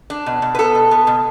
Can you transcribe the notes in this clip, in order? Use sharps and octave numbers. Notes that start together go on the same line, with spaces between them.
D4
B2
B2
B4
B3 A4
B2
B3
B2